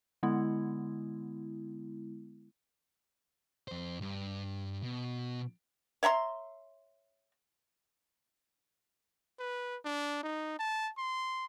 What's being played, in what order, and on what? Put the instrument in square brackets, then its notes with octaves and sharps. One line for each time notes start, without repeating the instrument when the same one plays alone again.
[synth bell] D3 G#3 B3 E4
[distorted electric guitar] F2 C5
G2
B2
[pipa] C#5 E5 A#5 C6
[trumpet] B4
D4
D#4
A5
C6